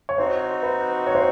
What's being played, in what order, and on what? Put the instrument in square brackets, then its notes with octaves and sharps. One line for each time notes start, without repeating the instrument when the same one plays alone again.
[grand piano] C#5
[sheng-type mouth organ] C4 D#4 F#4 [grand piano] C5
[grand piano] B4
C#5
C5